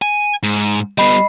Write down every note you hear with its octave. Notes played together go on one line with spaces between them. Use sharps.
G#5
G#2
G3 B3 D#5 B5 C7